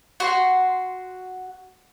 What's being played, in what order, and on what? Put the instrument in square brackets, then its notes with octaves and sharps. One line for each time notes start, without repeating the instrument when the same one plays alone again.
[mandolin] F#4 C6